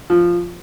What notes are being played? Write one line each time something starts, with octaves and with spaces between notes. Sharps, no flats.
F3